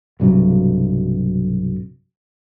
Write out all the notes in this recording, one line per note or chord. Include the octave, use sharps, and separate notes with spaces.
B1 G2 C3 F#3